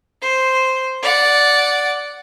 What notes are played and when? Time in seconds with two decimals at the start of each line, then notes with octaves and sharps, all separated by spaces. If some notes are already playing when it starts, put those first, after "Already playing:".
0.22 C5
1.03 D5 F#5